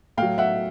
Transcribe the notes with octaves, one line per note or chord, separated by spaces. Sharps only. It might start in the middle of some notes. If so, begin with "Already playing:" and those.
A2 F#3 F5 G5
E5 F#5